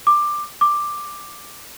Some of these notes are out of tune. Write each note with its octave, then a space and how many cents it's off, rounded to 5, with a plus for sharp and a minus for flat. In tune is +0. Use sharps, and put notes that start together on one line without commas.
D6 +15
D6 +10